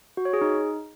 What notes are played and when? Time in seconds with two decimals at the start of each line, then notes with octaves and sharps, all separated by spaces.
0.17 F#4
0.25 C#5
0.33 G#4
0.41 D#4